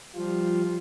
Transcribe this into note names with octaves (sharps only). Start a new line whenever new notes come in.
F3 G3 F4